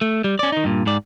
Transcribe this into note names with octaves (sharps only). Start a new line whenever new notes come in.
A3
G3
C#4 D5
D#3 D#4
G2 A#2
G#2 D5